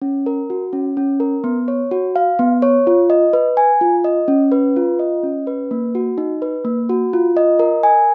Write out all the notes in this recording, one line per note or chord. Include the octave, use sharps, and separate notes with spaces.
C#4
A#4
F#4
C#4
C#4
A#4
B3
C#5
F#4
F5
B3
C#5
F4
D#5
B4
G#5
F4
D#5
C#4
B4
F4
D#5
C#4
B4
A#3
F#4
D#4
B4
A#3
F#4
F4
D#5
A#4
G#5